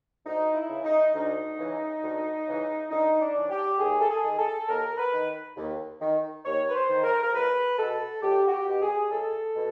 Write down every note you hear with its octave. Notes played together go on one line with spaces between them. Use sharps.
D2 D#4
E4
C#3 E3
D#4
D2 D#4
C#3 E3
D2
C#3 E3
D2 D#4
D4
C#3 E3
G4
D#2 G#4
A4
G#4
D#3
A4
D#2 A#4
B4
D#3
D#2
D#3
D#2 C#5
B4
C5
D#3
A#4
A#4
C#2 B4
B2 A4
C#2 G4
F#4
G4
B2
G#4
C#2 A4
B2